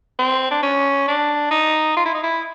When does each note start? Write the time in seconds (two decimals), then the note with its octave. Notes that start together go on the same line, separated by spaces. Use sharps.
0.19 C4
0.51 D4
0.63 C#4
1.08 D4
1.51 D#4
1.97 F4
2.05 E4
2.14 D#4
2.23 E4